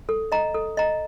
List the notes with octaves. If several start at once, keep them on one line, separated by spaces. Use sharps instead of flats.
A4
D#5 A#5
A4
D#5 A#5